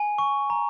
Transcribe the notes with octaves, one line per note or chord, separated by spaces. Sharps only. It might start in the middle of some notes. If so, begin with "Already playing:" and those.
Already playing: G#5
C#6
A#5